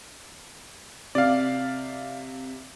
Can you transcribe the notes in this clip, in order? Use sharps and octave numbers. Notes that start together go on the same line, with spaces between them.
C3 D5 F5